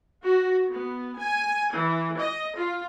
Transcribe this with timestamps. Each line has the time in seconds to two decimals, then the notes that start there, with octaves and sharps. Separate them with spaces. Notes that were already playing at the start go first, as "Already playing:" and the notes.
0.21 F#4
0.67 B3
1.18 G#5
1.72 E3
2.18 D#5
2.56 F4